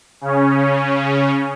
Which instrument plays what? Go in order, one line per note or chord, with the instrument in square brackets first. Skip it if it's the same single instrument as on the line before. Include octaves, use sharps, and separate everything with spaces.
[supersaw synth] C#3 C#4